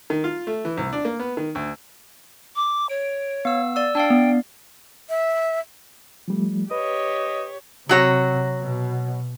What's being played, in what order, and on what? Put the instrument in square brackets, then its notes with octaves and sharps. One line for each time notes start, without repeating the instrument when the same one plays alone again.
[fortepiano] D#3
F4
A3
E3
C2
D4
A#3
B3
D#3
D2
[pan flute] D6
[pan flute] C#5 [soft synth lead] D7
[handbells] B3 E6 [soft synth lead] F5
[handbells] D5 E6
[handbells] D4 D5 F5 [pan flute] G5 [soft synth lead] A5
[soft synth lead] B3
[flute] E5
[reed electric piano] F3 G3 A3
[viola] G4 C#5 [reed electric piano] B4 [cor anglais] D#5
[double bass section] C3 [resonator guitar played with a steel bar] F#3 F#4 C#5
[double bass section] B2